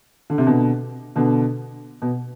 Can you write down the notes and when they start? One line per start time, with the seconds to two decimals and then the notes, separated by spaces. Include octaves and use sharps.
0.30 D3
0.38 C3
0.46 B2 D3
1.16 B2 D3
2.02 B2